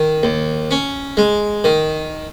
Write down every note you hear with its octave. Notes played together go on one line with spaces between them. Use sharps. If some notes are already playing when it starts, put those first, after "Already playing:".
Already playing: D#3
D#2
C#4
G#3
D#3